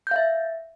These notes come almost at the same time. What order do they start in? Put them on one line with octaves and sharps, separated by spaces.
G6 F5 E5